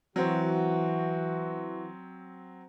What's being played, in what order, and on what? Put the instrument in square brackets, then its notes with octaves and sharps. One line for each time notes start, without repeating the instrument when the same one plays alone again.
[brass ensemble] E3 F#4 [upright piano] F#3 C4